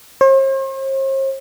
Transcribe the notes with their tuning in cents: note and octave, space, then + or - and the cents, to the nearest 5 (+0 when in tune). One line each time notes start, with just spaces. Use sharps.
C5 +45